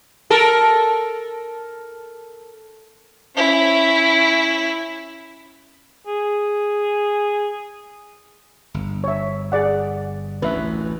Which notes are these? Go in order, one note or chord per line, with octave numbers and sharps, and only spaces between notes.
A4 A#4
C#4 E4
G#4
G1
C#5 E5
G#4 D5 F#5
A1 D2 B4 E5